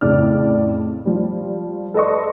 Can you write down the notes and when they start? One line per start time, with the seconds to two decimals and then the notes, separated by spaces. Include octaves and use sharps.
0.01 F2 A2 C#3 D5 F6
1.05 F3 G3
1.94 A4 B4 D5 D#5 C6 C#6